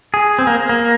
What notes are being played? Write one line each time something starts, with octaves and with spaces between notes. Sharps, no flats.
G#4
C4
A#3
A#3